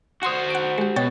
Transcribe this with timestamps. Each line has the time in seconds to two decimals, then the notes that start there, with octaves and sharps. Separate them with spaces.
0.23 F#4 C5 F#5 C6 D#6
0.50 F#5 D7
0.78 G#3 G4
0.96 B2 C#5 G5 A6